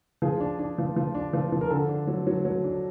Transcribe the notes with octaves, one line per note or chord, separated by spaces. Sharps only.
F3 G#4
D4
D4
F3
F3
D4
F3
F3
A#4
D3 A4
D4
F#3
F#3
F#3
D4